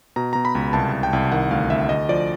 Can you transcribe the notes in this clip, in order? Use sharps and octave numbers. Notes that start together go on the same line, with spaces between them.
B2 A#5
B2 A#5
B5
C#2
C2 A5
C2
G5
C2
D#3 F#5
D2 F5
D2 E5
D2 D#5
F3 D5